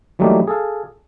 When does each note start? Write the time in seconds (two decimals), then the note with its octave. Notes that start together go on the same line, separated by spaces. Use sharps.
0.19 E3 F#3 G3 A3 A#3 D#4
0.47 G#4 A4 F5